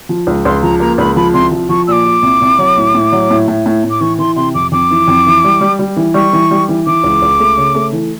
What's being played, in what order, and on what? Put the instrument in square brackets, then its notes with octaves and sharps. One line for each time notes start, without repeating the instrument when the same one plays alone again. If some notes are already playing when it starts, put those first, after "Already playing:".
[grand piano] F3
C#2
[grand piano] C#2 [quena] C6
[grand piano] F3 [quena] A#5
[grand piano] A#3 [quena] A#5
[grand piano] C#2 [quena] B5
[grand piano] F3 [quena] B5
[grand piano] C2 [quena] C6
[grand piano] F3
[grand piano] F3 [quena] C#6
[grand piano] A#2 [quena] D6 E6
[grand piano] A#2
C2
C2
F#3
A2
A2
F#3
A2
A2
A2
A2
[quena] D6
[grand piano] E3 [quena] C#6
[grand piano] E3 [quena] C6
[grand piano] C3 [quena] C6
[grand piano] F2 [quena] D6
[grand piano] F2 [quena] D6
[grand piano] E3
F2
E3
G3
G3
G3
E3
[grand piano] G3 [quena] C#6
[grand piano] E3
G3
E3
[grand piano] E3 [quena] D6
[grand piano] C#2
C#2
A3
C#3
A3
E3